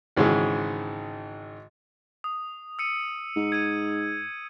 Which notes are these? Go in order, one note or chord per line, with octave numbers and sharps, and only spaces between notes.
G#1 G#2 C#3 E3 F#4 G#4
D#6
E6 C#7 D#7
G#2
G#6 C#7 D#7